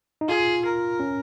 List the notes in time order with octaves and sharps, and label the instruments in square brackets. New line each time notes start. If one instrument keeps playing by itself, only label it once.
[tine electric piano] D#4
[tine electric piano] F4 [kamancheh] G#4
[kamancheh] A#4
[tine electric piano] C#4